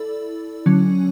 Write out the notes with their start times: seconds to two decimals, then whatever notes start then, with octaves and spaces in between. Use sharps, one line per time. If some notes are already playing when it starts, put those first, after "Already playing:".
Already playing: E4 A4 D5
0.66 D3 F#3 C#4